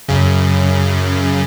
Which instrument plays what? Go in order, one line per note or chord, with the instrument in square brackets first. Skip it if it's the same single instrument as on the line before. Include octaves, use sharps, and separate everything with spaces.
[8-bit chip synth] F#2 C#3